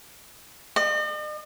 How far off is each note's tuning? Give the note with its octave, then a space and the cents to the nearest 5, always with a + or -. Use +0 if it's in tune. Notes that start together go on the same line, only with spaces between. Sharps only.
D#5 -45